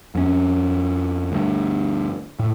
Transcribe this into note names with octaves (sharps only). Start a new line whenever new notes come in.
F2 C#4
D2 G2
A2